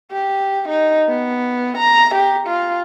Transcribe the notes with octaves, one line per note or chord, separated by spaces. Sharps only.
G4
D#4
B3
A#5
G4
F4